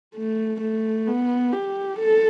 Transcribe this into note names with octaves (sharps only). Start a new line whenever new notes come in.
A3
A3
B3
G4
A4